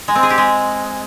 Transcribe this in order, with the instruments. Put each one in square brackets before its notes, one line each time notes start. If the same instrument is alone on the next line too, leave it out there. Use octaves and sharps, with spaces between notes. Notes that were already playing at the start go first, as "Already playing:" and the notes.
[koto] G#3
C4
G#4
G4
G#3